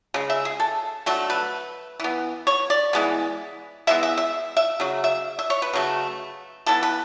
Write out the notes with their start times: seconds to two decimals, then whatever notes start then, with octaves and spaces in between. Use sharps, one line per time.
0.14 C#3 G#3
0.30 E5
0.45 G#4
0.60 A4
1.06 D3 F#3 A3 A4
1.30 B4
2.00 E3 B3
2.47 C#5
2.70 D5
2.93 E3 G#3 B3
3.87 E3 G#3 B3 E5
4.03 E5
4.17 E5
4.57 E5
4.80 C#3 F#3
5.04 E5
5.39 E5
5.50 C#5
5.62 B4
5.73 C#3 F#3 A3
6.66 E3 B3 A4
6.83 B4